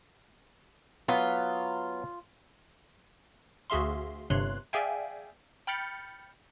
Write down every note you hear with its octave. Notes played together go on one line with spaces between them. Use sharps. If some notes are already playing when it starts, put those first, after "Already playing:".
F#3 B3 F4 B4
D2 F#4 G#4 E5 F5 C6
G1 G2 C3 C#5 C6 F#6
G#4 D5 E5 F5 G5 G#5
G5 B5 F6 G6 A6 C#7